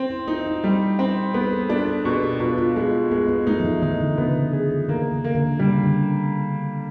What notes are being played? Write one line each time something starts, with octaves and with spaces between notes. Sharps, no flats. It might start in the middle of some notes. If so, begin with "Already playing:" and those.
Already playing: C4
E4
D#4 F4
F#4
G3 G4
C4
B3 G#4
A4
D4 A#4
A4
B2 G#4
G4
B2 F4
F4
G#3 F4
G#3 B3
B3
A3 D#4
F3
E3
D#3 D#4
D3
C#3 B3
D3
G#4
D3
E3
D#3 A#3
C#3
A#3
D3
C#3 G3
D3